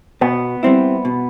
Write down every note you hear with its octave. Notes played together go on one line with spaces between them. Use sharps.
B2 B3
G3 C4 E4
B2